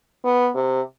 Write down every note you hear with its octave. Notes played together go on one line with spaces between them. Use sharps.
B3
C3